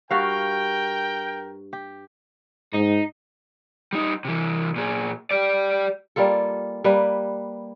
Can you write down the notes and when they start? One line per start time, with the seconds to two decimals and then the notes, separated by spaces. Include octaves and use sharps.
0.11 G2 F#4 A#4 F5 G5
1.73 G4
2.73 G#2 D#4
3.93 G3 D#4
4.25 C3 E3
4.76 A#2 G#4
5.31 G4 D5
6.16 G3 A#3 F4 A4
6.84 G3 A#3 B4